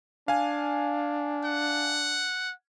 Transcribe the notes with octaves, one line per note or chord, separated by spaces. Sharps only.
D4 F5 G#5
F#5